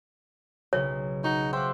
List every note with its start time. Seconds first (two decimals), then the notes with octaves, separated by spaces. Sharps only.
0.73 B1 C#3 C#5
1.24 D#4 F#4 G#4
1.53 C5 E5 F5 G5 C6 D6 F#6